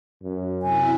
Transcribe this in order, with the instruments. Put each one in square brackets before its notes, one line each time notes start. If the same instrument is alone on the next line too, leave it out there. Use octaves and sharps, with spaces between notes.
[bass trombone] F#2
[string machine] C3 E4 [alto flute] G#5